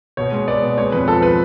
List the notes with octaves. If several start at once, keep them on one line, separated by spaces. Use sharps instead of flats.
B2 C#5
G#3
B3 D5
B2
G#3 C#5
F2 B4
F3 A4
B4